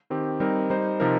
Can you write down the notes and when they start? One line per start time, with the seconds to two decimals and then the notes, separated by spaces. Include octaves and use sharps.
0.10 D#3 C4 G4
0.40 G3 C4 D#4 A#4
0.70 G3 D#4 C5
1.00 C3 F3 D#4 A#4